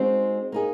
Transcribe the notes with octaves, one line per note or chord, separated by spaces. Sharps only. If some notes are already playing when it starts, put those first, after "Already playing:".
Already playing: G#3 C4 D#4 F#4 C5
A#3 D#4 G#4